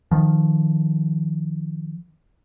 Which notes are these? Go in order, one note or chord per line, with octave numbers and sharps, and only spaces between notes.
D#3 F3